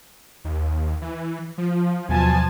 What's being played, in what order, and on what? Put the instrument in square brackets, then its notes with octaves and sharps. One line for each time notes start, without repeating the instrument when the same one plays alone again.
[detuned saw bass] D#2
E3
F3
[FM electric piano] D#2 F#3 [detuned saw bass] B2 [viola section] F3 G#5 A5